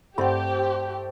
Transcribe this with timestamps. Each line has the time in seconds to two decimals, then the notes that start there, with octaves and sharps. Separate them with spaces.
0.18 G2 A3 C4 G4 D5 F#5